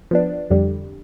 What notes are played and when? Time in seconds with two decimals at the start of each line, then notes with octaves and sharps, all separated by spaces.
0.11 F3 B3 D4
0.50 F2 D3 G3